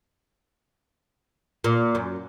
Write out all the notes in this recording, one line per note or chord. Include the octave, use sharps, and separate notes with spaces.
A#2
F#2